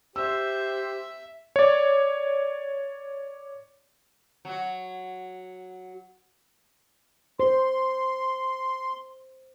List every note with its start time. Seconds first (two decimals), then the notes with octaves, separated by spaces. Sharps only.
0.16 G4 C5 E5 E6
1.56 C#5 D5
4.45 F#3 F#4
7.40 C5 C6